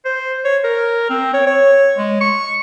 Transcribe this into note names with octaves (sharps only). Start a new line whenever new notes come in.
C5
C#5
A#4
C4
C#5
C#5
G#3
C#6